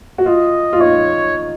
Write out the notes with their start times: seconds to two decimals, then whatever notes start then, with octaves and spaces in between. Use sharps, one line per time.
0.18 F#4
0.26 F4 D#5
0.73 F4
0.80 D#4 C#5